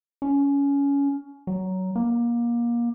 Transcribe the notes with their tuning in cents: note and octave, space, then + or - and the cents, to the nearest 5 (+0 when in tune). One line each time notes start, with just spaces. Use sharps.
C#4 +20
F#3 +15
A#3 +25